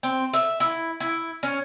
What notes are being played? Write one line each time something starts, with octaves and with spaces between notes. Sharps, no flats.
C4
E5
E4
E4
C#4